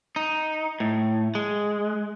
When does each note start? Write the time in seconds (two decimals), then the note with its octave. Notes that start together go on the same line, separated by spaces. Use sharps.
0.16 D#4
0.80 A2
1.35 G#3